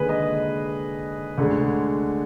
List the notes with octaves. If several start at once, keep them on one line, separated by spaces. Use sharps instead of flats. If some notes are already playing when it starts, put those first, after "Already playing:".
Already playing: D#2 D3 G#3 G#4 B4
D#5
D2 D3 G#3